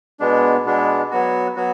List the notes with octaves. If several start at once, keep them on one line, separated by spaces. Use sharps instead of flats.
B2 G#3 B3 D4
B2 G#3 B3 D4
F#3 B3 F#4
F#3 B3 F#4